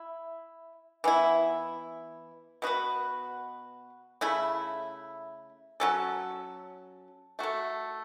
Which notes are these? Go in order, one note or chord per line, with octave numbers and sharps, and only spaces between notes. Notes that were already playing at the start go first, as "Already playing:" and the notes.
Already playing: E4
E3 B3 E4
B2 B3 F#4 B4
C#3 A3 E4
F#3 C#4 A4
A3 F#4 A4